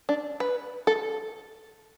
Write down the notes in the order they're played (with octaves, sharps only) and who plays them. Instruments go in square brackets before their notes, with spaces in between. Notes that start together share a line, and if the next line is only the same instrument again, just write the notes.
[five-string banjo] D4
B4
A4